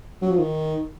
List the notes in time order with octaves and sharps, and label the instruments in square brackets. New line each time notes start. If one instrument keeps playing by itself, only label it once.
[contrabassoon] F#3
F3
D#3